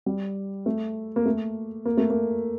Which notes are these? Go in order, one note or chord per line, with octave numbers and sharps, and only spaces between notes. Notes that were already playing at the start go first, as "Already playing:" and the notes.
G3
A3
A#3
A3
A#3
A3
A#3